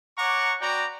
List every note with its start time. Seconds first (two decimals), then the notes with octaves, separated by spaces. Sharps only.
0.18 C#5 F#5 A#5 C#6 D6
0.61 B3 F#4 D5 G5 A#5